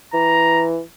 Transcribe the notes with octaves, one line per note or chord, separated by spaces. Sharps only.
E3 A#5